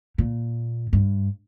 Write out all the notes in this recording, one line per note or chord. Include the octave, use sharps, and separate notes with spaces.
A#2
G2